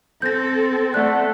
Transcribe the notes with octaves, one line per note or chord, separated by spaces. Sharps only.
C4 A4 G6 A#6
A3 D5 F#5 A5 F#6